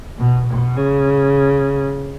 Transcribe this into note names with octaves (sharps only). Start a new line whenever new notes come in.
B2
B2
C#3